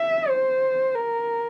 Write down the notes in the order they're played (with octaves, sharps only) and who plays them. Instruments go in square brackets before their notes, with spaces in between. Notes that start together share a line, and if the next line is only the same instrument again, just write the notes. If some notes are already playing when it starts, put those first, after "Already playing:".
Already playing: [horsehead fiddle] E5
C5
A#4